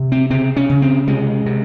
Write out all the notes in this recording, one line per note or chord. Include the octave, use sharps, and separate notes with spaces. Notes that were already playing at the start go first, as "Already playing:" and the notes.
Already playing: C3
C4
C#3 C4
C#4
C#3
C4
C3 G#3
C3